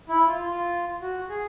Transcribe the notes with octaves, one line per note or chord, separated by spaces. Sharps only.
E4
F4
F4
F#4
G#4